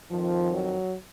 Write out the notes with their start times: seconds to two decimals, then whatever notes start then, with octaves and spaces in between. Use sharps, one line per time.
0.11 F2 D#3 F3
0.51 F#3